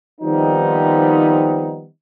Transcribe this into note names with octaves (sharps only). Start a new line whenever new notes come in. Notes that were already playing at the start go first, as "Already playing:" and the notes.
D#3 F3 G3 B3 C4 D#4